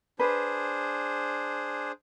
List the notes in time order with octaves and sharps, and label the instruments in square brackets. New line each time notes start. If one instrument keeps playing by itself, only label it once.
[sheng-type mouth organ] D4 G#4 C5 [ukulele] B4